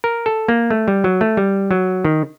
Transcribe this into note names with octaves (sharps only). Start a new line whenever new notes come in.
A#4
A4
A#3
A3
G3
F#3
A3
G3
F#3
D#3